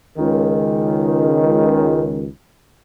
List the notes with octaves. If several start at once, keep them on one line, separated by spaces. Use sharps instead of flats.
C#2 D#3